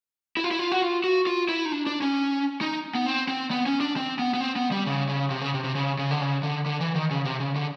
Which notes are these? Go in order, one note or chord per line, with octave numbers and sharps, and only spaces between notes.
E4
F4
E4
F4
F#4
F4
F#4
F4
E4
D#4
D4
D4
C#4
D#4
B3
C4
C4
B3
C#4
D4
C4
B3
B3
C4
B3
G3
C#3
C#3
C3
C#3
C3
C3
C#3
C#3
D3
C#3
D3
D3
E3
D#3
C#3
C3
C#3
D3